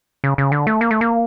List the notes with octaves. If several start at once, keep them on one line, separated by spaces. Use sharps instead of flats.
C#3
C#3
D3
A3
A#3
A3
A#3